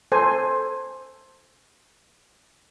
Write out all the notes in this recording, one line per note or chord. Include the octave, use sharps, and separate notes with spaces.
A4 C5 G#5